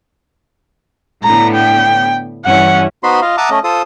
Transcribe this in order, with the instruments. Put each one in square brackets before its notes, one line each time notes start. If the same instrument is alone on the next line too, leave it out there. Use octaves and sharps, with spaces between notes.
[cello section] A2 D3 B3 [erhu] A#5
[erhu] G5
[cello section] G2 E3 C#4 [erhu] F#5
[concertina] B3 D#4 F#4 C5 B5 C6
F4 D#5 F5
E5 F#5 A5 A#5 D6 D#6
A3 C#4 D#5
F4 A4 C5 D#6